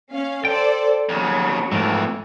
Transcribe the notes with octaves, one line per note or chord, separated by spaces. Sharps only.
C#4 F5
A4 C5 D5 G5
D#2 C#3 F#3
F2 G#2 E3 A3 A#4